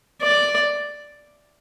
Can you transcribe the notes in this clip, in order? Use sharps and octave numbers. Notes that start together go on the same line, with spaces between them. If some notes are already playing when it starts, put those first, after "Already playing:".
D5